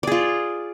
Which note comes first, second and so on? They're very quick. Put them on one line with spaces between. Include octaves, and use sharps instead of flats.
D5 G#4 F4